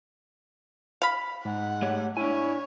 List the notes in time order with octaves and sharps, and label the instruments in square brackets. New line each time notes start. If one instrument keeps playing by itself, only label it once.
[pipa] F5 B5
[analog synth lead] G#2 [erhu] F#5
[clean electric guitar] A3 G4 C#5
[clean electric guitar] D4 G#5 [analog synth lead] E4 [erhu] C#5